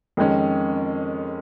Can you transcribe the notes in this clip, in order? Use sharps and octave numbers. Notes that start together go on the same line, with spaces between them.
F2 D#3 G#3 C#4